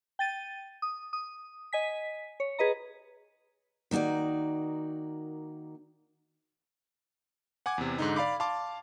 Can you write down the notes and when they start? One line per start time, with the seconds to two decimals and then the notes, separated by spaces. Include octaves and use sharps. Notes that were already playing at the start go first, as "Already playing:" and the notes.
0.19 G5 A6 D#7
0.82 D#6
1.13 D#6
1.73 D#5 G#5 B6
2.40 C#5
2.59 G#4 B4 D#5 A#5
3.91 D#3 A#3 D#4 F#4 D5
7.66 F#5 G#5 D6 G#6
7.78 E2 C3
7.98 G#2 D3 D#4
8.16 D5 F5 B5 D6
8.40 F5 A5 C6 D6